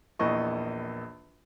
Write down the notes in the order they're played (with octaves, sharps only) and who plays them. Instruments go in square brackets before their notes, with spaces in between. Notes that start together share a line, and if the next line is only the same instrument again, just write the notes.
[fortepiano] A#1 E2 E3 D#5 C#6